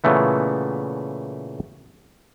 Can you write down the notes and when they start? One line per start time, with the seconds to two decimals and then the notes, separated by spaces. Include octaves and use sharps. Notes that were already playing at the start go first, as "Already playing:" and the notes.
0.04 A#2 C#3 E3 A3 B3